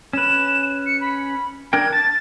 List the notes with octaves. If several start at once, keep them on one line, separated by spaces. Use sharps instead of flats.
C#4 B4 E7
C#7
B5
D4 A#4 G5 G#6
A5 A6